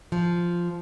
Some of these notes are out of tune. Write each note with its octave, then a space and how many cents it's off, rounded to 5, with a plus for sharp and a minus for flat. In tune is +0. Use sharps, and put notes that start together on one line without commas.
F3 -5